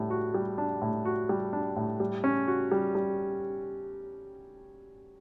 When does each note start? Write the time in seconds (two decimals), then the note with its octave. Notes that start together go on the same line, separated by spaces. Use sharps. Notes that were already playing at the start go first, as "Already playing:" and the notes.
Already playing: A2 G3 D4
0.10 F#4
0.34 G3
0.58 D4
0.82 A2
1.05 F#4
1.29 G3
1.53 D4
1.77 A2
2.00 G3
2.24 C#4
2.48 F#4
2.71 G3
2.95 G3